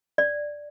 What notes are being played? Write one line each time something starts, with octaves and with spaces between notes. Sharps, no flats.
D5